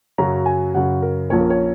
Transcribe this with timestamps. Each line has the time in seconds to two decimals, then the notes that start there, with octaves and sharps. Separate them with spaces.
0.18 F#2 C#3 F#3 A#5
0.46 G#5
0.74 F#2 C#3 F#3 F#5
1.02 A#4
1.30 A#1 A#2 A#3 C#4 C#5
1.40 A#4
1.50 C#5